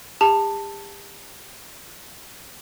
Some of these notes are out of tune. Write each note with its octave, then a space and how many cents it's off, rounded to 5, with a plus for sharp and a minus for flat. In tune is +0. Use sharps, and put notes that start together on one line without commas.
G4 +40 A5 +10